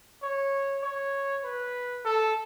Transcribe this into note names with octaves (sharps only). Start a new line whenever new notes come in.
C#5
C#5
B4
A4